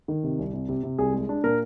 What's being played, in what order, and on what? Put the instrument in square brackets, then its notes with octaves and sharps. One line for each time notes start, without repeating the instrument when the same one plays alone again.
[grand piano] D#3
C3
C2
C3
C3
C3
C2 G#4
G#3
D4
A#2 A#4